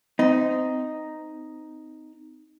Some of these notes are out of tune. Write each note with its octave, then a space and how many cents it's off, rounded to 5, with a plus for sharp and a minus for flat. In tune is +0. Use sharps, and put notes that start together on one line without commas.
C4 -30 D#4 +0